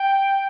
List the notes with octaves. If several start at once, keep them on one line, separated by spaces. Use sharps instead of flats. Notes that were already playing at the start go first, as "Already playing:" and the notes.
Already playing: G5